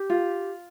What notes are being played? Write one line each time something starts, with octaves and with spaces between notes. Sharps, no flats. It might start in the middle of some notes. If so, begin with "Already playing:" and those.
Already playing: G4
F4